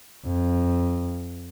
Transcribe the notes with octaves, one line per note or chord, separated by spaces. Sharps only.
F2